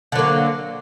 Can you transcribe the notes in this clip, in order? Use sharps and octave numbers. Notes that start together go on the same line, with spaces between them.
D3 F#3 A#3